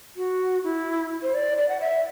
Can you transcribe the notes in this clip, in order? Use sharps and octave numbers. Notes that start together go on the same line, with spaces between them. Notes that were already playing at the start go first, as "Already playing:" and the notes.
F#4
E4
C5
D5
D5
F#5
E5